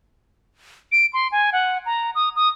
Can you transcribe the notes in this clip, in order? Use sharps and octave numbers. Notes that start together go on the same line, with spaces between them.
D7
C6
G#5
F#5
A#5
D#6
D#6